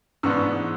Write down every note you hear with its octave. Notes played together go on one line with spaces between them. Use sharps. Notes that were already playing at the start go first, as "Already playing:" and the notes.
G#2 E3 G#3 B3 D4 C#6 E6